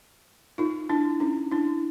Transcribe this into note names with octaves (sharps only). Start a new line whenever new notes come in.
D#4 F4
D4 E4
C#4 D#4
D4 E4